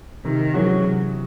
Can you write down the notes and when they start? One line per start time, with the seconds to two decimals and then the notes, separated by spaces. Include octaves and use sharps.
0.24 C3 D#3
0.54 E3 F#3 G#3 C#4 F#4
0.84 C3